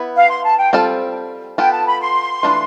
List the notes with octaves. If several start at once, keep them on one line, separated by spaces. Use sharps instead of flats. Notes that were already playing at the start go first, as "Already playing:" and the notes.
Already playing: B3 E4 B4
F5
C6
A5
G5
G3 C4 F4 A4
B3 F4 A4 G5
A5
B5
C6
E3 A3 D4 F4 B4